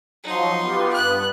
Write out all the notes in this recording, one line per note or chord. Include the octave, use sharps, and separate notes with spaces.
F3 F#3 D#4 C6
B3 F4 G4
G2 B3 F#6